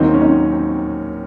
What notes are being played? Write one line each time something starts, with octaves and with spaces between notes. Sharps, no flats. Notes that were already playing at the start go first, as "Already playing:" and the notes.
Already playing: D#2 D#3 F#3 C4 D#4
C#4
C4 D#4
C4